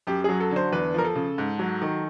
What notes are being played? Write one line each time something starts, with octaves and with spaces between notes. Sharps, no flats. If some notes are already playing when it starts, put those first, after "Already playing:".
F#2 G4
F#3 G#4
A4
D3 C5
E2 B4
F3 A#4
A4
C#3
G#2
F#3
D#3